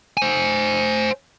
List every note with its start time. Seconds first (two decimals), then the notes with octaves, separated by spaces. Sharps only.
0.17 C5 G#5